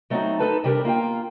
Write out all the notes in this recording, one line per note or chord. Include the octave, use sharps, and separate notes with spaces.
F#3 A3 C4 D4 D#4 F#4
D#4 A4 B4 A5
C3 G3 D4 G4 A4 A#4
A#3 F4 E5 G5